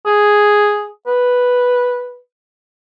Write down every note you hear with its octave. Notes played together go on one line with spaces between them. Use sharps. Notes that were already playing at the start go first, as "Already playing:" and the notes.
G#4
B4